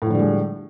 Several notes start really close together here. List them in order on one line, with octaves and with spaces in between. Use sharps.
A2 F3 D3 G3 G#3